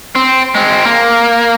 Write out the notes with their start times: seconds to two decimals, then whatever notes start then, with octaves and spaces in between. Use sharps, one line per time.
0.15 C4
0.55 G#3 C4
0.85 A#3